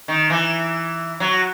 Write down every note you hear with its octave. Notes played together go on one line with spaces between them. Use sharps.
D#3
E3
F#3